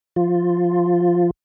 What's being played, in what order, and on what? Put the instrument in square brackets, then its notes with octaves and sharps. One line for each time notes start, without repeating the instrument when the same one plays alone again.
[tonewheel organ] F3 F4